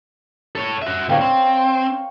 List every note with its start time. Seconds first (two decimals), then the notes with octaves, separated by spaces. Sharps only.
0.55 A4 C#5
0.82 F#4 E5
1.09 D2 A2 C#5 F5 G5
1.21 C4